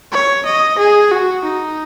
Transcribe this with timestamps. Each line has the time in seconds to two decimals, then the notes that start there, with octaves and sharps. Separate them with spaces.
0.12 C#5
0.45 D#5
0.78 G#4
1.11 F#4
1.44 D#4